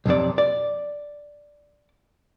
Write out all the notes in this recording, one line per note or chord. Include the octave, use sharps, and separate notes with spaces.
B1 F2 C3 D5
D5